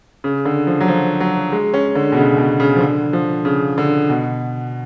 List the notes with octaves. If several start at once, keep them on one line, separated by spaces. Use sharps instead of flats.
C#3
D3
F3
F#3
F3
F#3
G#3
C#4
D3
B2
C#3
B2
C#3
F3
D3
F3
C#3
D3
B2